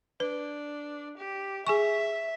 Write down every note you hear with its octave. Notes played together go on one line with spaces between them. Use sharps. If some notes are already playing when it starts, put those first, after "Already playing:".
D4 B4
G4
G#4 E5 G#5 C#6